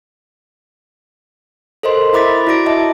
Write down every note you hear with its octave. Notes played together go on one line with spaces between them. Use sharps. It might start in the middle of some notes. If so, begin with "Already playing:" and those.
A4 A#4 C5 D#5 C6
E4 E5 B5 D6 A6 B6
E4 F#4 D5 D6 A#6 D7
D#5 E5 A5 D6